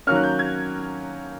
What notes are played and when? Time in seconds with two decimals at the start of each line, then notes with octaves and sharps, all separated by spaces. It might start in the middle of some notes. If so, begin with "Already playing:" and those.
0.07 D#3 F#3 A#3 C#4 F6
0.16 F#6
0.23 G6
0.39 G#6